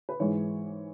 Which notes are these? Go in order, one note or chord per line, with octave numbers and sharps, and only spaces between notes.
B4
G#2 E3 G#3 C#5